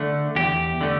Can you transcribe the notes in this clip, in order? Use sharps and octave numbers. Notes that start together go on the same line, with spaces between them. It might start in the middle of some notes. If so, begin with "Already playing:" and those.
Already playing: D3 A3
E2 G4
D3 A3